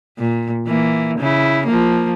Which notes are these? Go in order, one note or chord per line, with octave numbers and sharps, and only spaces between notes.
A#2
E3 A#3
C#3 E4
F3 A#3